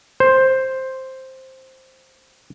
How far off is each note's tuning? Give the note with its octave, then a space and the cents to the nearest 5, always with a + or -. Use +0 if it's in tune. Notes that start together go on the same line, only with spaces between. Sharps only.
C5 +5